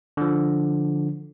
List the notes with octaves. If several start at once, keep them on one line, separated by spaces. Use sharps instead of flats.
D3 F3